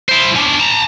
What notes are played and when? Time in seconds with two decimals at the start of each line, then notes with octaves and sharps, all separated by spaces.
0.09 E4 C5
0.36 C#4 D4
0.60 A5 A#5